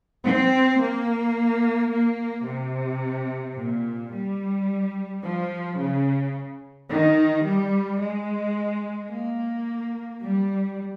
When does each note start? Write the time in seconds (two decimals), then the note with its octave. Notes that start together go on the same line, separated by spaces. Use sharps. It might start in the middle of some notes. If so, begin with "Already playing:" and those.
0.24 C4
0.79 A#3
1.90 A#3
2.46 C3
3.56 A#2
4.12 G3
5.22 F3
5.78 C#3
6.88 D#3
7.44 G3
7.99 G#3
9.10 A#3
10.21 G3